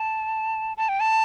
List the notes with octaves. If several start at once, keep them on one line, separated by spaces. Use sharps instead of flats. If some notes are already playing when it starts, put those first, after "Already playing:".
Already playing: A5
A5
G5
A5